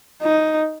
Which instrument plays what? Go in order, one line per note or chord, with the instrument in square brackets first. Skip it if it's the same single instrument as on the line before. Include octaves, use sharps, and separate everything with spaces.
[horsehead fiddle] D#4